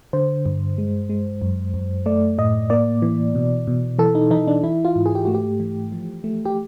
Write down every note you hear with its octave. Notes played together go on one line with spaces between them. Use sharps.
D3 C5
G2
G#3
G#3
F#2
F#2
A3 D5
A2 D#5
A#3 D5
E3
B2
B2
E3 A4
D#4
E3 D#4
D4
E3 E4
F4
G#2
G#4
G4
A3 F#4
G4
E3
F3
A3
G4